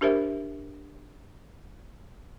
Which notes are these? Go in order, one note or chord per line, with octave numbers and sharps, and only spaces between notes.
D4 G4 A#4 C5 E5